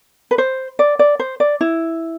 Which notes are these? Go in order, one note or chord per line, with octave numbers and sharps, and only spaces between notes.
B4
C5
D5
D5
C5
D5
E4